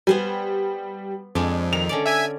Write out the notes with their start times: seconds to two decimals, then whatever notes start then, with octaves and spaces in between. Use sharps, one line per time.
0.07 G3 B3 C5 G#5
1.35 F2 G#3 D4
1.73 D#3 F7
1.89 D3 C#4 D5
2.06 E5 G#5 G#6